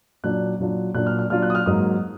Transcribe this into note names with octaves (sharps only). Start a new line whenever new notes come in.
A#2 F#3 D4 F4 F#6
A#2 F#3 D4 F4
A#2 F#3 D4 F4 F#6
F6
F6
A#2 F#3 D4 F4 F6
F#6
D#6
F6
G#2 F#3 A#3 D#4 D#6